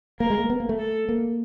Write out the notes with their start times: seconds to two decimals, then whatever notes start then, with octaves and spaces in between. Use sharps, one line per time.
0.20 A#3 A#4
0.30 G#3
0.39 A#3
0.50 B3
0.60 A#3
0.69 A3
0.79 A4
1.09 A#3